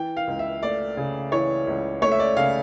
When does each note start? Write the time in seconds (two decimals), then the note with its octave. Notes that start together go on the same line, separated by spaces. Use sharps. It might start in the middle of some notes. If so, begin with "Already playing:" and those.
Already playing: E3 G5
0.17 F5
0.27 C#2
0.39 E5
0.63 A3 D5
0.97 C#3
1.32 E3 C#5
1.67 C#2
2.02 A3 C#5
2.11 E5
2.19 D5
2.36 C#3 F5